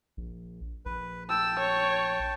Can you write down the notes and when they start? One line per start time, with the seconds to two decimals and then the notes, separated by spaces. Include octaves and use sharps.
0.17 A#1
0.86 A#1 B4
1.29 G5 A5 E6
1.59 C#5